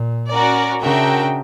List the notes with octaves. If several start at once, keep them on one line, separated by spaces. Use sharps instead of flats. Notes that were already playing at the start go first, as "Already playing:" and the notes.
Already playing: A#2
C#4 F#4 A#4 D5
C#3 D4 F#4 A#4 E5 G5